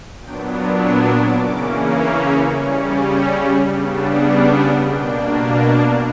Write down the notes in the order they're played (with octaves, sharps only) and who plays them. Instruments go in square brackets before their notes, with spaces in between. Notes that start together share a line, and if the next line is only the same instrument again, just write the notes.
[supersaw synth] A#2 F#3 B3 D4 G5
A#5
E6
D6
C#3 E3 A#3 C#4 D6
C#6
B5
C#3 G3 C#4 C#6
D6
E6
C#3 G3 B3 D4
E6
D6
F#5
B2 A#3 D4 G5
A#5
A#5